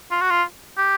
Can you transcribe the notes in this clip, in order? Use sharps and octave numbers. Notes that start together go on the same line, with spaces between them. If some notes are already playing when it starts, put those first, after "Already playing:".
F4
F#4
F4
G4